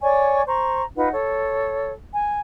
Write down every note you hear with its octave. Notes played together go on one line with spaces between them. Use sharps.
C#5 D5 G#5 C#6
C5 A#5 C#6
D#4 F4 B4 F#5
A4 C#5
G#5